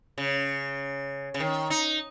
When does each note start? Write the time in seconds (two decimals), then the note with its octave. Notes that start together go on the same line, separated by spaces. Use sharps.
0.18 C#3
1.34 C#3
1.40 D#3
1.70 D#4